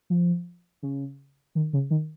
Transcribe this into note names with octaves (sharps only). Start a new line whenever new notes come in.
F3
C#3
D#3
C#3
D#3